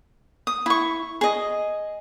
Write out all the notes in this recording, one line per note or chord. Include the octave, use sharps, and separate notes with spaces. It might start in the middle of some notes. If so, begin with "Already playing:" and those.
D#6
E4 C#6
G#4 D#5